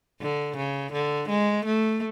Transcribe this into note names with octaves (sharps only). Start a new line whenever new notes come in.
D3
C#3
D3
G#3
A3